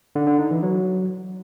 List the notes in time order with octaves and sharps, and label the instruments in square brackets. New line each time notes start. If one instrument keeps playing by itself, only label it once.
[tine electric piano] D3
D3
D#4
E3
F#3